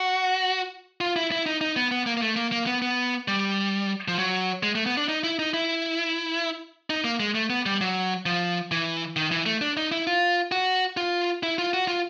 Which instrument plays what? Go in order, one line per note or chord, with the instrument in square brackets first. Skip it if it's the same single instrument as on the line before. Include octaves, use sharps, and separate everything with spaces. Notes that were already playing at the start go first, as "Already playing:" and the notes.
Already playing: [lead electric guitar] F#4
F4
E4
E4
D#4
D#4
B3
B3
A#3
A#3
A3
A#3
A#3
B3
B3
G3
F3
F#3
G#3
A3
B3
D4
D#4
E4
D#4
E4
D#4
A#3
G#3
A3
B3
G3
F#3
F3
E3
D#3
E3
A3
D4
D#4
E4
F4
F#4
F4
E4
F4
F#4
F4